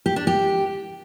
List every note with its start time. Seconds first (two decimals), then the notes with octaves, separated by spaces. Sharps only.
0.06 G4
0.16 D4
0.27 G4